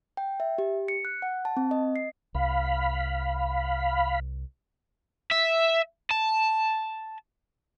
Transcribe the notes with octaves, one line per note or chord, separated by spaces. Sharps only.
G5
E5
G4
C#7
F#6
F#5
A5
C4
D#5
C7
C2 F5 B5
E5
A5